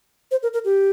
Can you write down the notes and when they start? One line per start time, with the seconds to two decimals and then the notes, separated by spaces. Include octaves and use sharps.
0.31 C5
0.43 A#4
0.53 A#4
0.65 G4